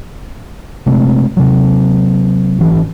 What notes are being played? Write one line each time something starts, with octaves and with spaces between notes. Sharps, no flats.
C3 G#3 A3 C4
C3 F#3
G#1 E3